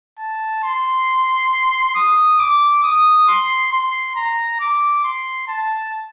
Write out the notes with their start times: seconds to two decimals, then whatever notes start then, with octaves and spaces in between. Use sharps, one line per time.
0.18 A5
0.63 C6
1.95 D#6
2.39 D6
2.83 D#6
3.28 C6
3.72 C6
4.16 A#5
4.60 D6
5.04 C6
5.48 A5